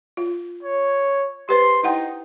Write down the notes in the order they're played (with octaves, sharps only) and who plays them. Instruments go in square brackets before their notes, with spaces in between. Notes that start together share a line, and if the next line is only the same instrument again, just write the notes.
[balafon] F4
[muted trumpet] C#5
[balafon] G4 B4 C5 [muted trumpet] C6
[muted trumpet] D#4 [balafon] E4 F#5 G5